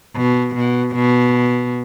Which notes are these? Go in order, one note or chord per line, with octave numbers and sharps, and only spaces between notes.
B2
B2
B2